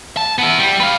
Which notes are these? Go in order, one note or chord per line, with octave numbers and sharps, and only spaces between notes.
A5
B3 E4
G3
B4 F5